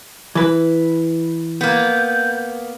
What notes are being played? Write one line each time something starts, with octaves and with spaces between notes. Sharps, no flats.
E3 B4
A#3 B3 G6